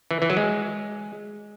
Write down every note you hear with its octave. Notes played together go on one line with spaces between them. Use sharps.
E3
E3
F#3
G#3